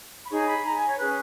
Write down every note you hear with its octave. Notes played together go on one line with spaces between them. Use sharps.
B5
D#4 G#4 C#5 C#6
A#5
B5
A#5
G#5
C#5
C#4 G#4 B4